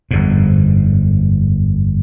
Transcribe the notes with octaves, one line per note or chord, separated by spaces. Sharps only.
G1 F2 G#2